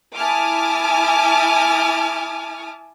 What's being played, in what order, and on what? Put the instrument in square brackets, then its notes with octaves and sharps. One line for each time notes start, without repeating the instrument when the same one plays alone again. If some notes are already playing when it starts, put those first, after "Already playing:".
[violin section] E4 G#5 A5 D6 D#6 F6